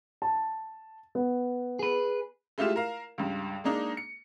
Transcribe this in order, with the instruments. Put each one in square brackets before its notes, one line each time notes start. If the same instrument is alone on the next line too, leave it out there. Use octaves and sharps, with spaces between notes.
[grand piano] A5
B3
[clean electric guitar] G#4 B4
[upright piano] G#3 A3 E4 F4 G4 E7
A#4 F5 A#5
C#2 G2
G#3 A#3 D4 D#4
C#7